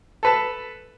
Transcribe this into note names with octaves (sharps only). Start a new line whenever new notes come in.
A4 B4 A5